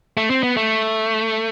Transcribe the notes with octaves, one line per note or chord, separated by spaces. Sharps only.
A3
C4
B3
A3